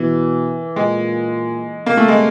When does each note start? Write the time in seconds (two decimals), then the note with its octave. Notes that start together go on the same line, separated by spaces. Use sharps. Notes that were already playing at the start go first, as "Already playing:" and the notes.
Already playing: B2 E3
0.76 A#2 G#3
1.86 C3 A#3
1.97 A3
2.08 G#3